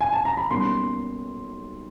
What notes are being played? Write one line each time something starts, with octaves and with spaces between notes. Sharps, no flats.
G#5
A5
A#5
B5
B1 B2 G3 A#3 C#4 C6